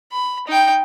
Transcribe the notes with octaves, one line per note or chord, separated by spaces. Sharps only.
B5
D#4 G5